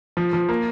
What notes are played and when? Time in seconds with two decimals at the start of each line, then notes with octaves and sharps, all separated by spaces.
0.17 F3
0.33 F3
0.49 A#3